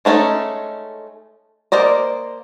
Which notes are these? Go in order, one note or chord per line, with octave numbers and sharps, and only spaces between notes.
G#3 A3 C#4 D#4 A4
A#3 C5 D5 D#5